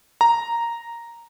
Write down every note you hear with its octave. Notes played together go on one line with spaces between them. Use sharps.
A#5